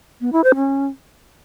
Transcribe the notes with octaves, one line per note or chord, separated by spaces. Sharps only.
B3
E4
C5
C#4